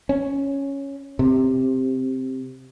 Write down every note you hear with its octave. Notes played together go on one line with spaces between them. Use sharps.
C#4
C3